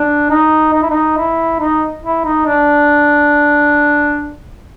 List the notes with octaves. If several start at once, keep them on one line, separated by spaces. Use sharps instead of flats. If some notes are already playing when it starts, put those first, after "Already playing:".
Already playing: D4
D#4
D#4
E4
D#4
E4
D#4
E4
D#4
D4